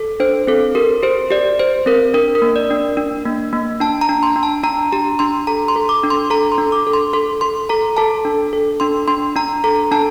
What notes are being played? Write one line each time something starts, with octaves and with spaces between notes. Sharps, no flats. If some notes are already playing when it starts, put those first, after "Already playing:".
Already playing: A4
D4 C5
C4 A4
G4 A#4
G4 C5
G4 D5
G4 C5
C4 A#4
D4 A#4
A#4
A#3
D5
D4
D4
A#3
A#3
D4 A5
A#5
D4
C6
D4
A5
D4 A#5
G4 A#5
D4 C6
A4 A#5
C6
A4
D6
D4
C6
A4 A#5
C6
D4
D6
A4
C6
A4 C6
A4 C6
A4 A#5
A4 A5
D4
A4
D4 C6
D4 C6
D4 A#5
A4 A#5
D4 A5